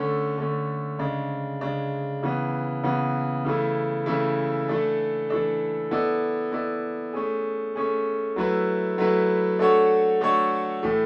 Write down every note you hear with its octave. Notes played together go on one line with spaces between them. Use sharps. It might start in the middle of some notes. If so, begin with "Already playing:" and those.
Already playing: D3 A3 C#4
D3 A3 C#4
C#3 G#3 D4
C#3 G#3 D4
C#3 E3 B3
C#3 E3 B3
C#3 E3 A3 E4
C#3 E3 A3 E4
E3 A3 D4 A4
E3 A3 D4 A4
B3 E4 A4 D5
B3 E4 A4 D5
A3 C#4 G#4
A3 C#4 G#4
F#3 A3 E4 B4
F#3 A3 E4 B4
A3 D4 F#4 A4 C#5
A3 D4 F#4 A4 C#5
A2 E3 A3